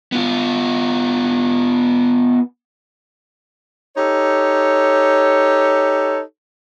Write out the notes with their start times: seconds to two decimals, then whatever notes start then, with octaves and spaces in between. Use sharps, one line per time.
0.12 B3 F4
3.97 D#4 G4 A4 C#5